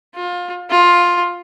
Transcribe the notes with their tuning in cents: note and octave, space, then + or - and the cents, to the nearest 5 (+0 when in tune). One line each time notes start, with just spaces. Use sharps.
F4 +25
F4 +10